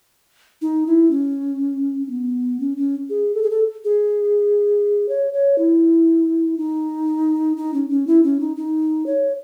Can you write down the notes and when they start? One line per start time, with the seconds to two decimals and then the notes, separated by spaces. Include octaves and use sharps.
0.62 D#4
0.87 E4
1.11 C#4
2.07 C#4
2.10 B3
2.60 C#4
2.77 C#4
3.10 G#4
3.34 A4
3.43 G#4
3.51 A4
3.85 G#4
5.09 C#5
5.33 C#5
5.58 E4
6.57 D#4
7.57 D#4
7.74 C#4
7.90 C#4
8.07 E4
8.23 C#4
8.40 D#4
8.57 D#4
9.06 C#5